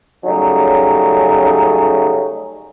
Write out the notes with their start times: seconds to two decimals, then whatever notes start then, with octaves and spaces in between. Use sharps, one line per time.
0.25 C#3 F#3 G3 A3 C#4 D#4